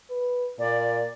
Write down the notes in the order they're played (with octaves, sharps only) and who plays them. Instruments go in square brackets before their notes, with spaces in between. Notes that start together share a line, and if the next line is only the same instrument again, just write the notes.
[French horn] B4
[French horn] A#2 [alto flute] D5